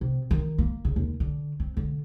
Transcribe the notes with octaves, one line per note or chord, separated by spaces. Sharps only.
C3
D#3
A#3
C#3
D#2
D3
C4
D3